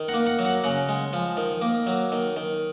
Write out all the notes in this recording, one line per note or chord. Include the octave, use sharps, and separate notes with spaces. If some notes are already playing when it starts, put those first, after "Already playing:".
Already playing: D#3
F#5 A#5
A#3
F#5 A#5
F#3
F#5 A#5
C#3 F#5 A#5
G#3
F3
D#3
A#3
F#3
D#3
D#3